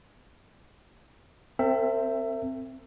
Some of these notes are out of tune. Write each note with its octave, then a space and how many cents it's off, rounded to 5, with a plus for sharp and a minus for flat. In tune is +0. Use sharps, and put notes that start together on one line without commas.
C4 +0 A#4 -45 E5 +15